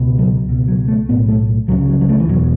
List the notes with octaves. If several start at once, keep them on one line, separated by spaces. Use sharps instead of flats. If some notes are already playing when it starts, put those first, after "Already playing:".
Already playing: C#2 B2
F#3
C#2 B2
F#3
A3
B1 A2 B3
A3
C#2 C#3 F#3
F#3
F#3
A3
E3
E1 E2 B2 F#3